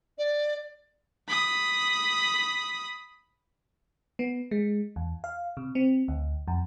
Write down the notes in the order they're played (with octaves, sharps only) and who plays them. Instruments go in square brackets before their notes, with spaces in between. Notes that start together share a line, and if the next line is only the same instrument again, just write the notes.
[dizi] D5
[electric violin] B5 D#6
[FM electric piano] B3
G#3
E2
F5
C3
C4
D2
F2